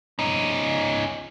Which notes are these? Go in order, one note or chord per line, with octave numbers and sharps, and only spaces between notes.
C#4 D#4